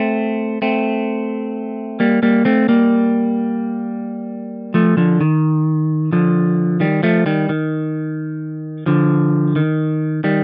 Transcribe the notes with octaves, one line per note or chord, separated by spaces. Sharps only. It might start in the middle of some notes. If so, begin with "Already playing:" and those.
Already playing: A3 C4
A3 C4
G3 A#3
G3 A#3
A3 C4
G3 A#3
F3 A3
D3 F3
D#3
D3 F3
D#3 G3
F3 A3
D#3 G3
D#3
D3 F3
D#3
D#3 G3